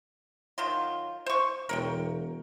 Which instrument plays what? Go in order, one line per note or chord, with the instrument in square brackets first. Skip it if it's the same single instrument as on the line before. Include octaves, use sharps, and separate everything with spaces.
[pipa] D#3 F#3 F4
C5 C#6
[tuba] E1 [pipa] A#4 C#5 G5